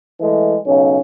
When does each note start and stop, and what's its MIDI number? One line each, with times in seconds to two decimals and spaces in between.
0.21 0.57 52
0.21 0.57 56
0.21 0.57 57
0.66 0.99 35
0.66 0.99 49
0.66 0.99 61